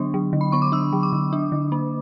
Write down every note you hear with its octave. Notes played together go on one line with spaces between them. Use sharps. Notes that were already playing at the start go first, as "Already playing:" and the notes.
Already playing: D3 F#3 B3 D4 C#6
F#3
D3
B5
B3 C#6
D6
D4 E6
F#3
D6
D3
D4
D3
A#3